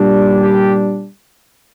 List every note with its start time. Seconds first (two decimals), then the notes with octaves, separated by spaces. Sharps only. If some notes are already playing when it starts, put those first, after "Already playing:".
Already playing: A#2 G3 D4
0.41 G4